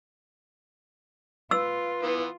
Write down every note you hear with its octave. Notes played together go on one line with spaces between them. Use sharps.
F4 B4 E6
E3 B3